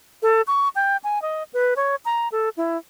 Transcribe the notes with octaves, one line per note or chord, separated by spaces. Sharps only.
A4
C#6
G5
G#5
D#5
B4
C#5
A#5
A4
E4